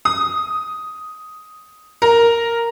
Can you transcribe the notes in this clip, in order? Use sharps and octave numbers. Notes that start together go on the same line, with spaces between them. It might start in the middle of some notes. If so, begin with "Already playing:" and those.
D#6
A#4